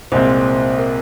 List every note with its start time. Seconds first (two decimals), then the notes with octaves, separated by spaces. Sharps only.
0.12 C2 A#2 G#3 C4 C5
0.79 A#4